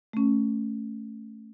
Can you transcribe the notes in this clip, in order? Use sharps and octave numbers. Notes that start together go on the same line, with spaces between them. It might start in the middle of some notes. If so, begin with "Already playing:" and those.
A3 C#4